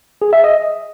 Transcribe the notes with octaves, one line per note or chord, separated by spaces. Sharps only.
G#4
E5
D#5